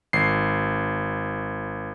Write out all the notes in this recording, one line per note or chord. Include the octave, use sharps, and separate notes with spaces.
G#1 C7